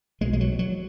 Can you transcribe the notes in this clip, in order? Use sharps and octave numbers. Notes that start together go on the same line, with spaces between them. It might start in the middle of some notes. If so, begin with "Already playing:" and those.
B1 B2 G#3
G#3
F#3
F#3